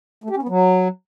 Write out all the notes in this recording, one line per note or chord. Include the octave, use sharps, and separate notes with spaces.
A3
G4
C#4
B3
F#3